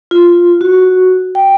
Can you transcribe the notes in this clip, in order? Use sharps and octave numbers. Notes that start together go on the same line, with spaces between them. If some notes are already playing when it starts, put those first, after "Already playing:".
F4
F#4
G5